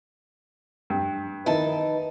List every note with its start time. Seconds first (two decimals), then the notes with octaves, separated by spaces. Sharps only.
0.90 G2
1.46 D#3 D#4 E4 B4 A5